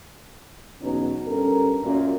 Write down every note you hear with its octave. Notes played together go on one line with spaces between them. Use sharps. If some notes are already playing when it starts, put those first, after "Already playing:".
E2 B2 F#3 C#4 D#4
G2 C#4 A4 A#4
F#2 A#2